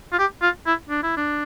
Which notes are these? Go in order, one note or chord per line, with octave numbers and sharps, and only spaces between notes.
F4
G4
F4
E4
D4
E4
D4